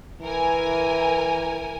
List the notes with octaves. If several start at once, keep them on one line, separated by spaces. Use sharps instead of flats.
E3 A#4 G#5